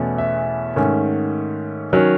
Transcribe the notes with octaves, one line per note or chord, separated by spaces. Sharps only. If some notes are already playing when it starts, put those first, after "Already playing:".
Already playing: E2 B2 A3 C#4
E5
G#2 D#3 A3 C#4
D#3 F#3 C#4